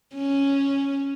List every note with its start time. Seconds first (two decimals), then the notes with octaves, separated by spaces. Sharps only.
0.15 C#4